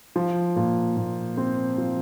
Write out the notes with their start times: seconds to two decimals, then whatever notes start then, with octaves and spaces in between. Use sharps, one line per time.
0.16 F3
0.56 A#2
0.97 A#2
1.37 C4
1.78 F3